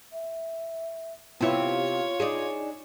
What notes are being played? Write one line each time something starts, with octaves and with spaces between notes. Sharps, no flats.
E5
C3 B3 C4 E4 F4 C#5
D4 D#4 G#4